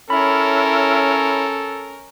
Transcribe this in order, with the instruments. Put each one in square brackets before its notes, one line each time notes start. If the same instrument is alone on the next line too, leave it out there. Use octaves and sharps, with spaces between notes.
[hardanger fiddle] C#4 A#4 [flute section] E4 C#5 F6 [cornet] A4 [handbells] B5